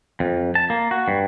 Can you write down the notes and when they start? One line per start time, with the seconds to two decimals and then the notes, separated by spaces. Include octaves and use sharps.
0.20 F2
0.55 A5
0.70 A#3
0.91 F#4
1.08 G2